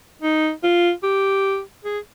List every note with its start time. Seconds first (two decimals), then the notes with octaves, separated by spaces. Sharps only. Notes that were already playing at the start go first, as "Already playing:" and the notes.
0.22 D#4
0.63 F4
1.03 G4
1.85 G#4